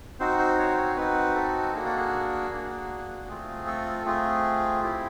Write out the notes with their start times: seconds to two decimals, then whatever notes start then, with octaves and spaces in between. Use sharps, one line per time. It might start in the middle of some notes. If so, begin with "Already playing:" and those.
0.20 C4 D#4 F#4 C5
0.39 C5
0.58 C#5
0.77 C#5
0.96 C4 D#4 F#4 B4
1.35 A4
1.74 A#3 D4 F#4 G#4
1.86 A4
1.97 G#4
2.51 A#3 D4 F#4
3.29 A3 C4 F4 G#4
3.67 A4
4.05 A3 C4 F4 G#4
4.83 C4 E4 G4